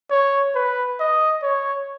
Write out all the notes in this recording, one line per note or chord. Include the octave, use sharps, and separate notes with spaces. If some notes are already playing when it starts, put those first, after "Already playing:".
C#5
B4
D#5
C#5